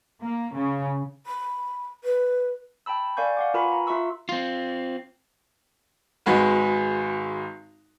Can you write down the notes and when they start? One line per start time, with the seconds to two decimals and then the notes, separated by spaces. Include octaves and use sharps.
0.21 A#3
0.53 C#3
1.26 B5
2.04 B4
2.86 G5 A5 B5 E6
3.17 A#4 D5 F5 G#5 C#6 G6
3.37 F5 F#5 D6
3.54 F4 A#4 B4 G#5 B5 C#6
3.71 A#5
3.86 F4 E5 C6 C#6 E6 F6
4.29 C4 F4
6.26 G#1 G#3 F#4 B4